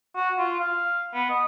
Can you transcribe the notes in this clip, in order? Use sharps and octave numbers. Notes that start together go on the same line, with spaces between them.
F#4
F4
F5
B3
D#5